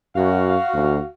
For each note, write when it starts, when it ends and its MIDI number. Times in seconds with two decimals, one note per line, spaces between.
0.16 0.56 42
0.16 1.10 66
0.16 1.10 77
0.74 0.98 38